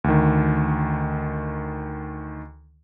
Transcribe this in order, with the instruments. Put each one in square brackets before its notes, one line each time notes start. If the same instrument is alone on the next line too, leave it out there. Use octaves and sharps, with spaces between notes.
[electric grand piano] D2 D#3